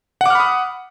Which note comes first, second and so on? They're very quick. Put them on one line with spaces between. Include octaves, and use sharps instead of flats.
F#5 D6 F6 B5 D#6